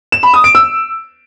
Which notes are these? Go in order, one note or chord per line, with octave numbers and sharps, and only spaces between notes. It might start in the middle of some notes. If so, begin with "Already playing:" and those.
E7
B5
D#6
D7
E6